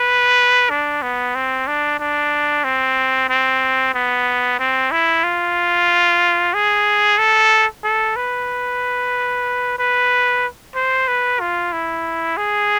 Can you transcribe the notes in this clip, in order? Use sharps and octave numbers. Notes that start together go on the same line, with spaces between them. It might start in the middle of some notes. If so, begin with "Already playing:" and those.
Already playing: B4
D4
B3
C4
D4
D4
C4
C4
B3
C4
E4
F4
G#4
A4
A4
B4
B4
C5
B4
F4
E4
G#4